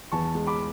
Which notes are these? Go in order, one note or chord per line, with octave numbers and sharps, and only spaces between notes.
E2 A5 C#6
G#3
B5 D6